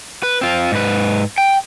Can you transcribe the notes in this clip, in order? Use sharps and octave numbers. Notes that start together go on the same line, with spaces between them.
B4
C4 F4
G#2 B4
G5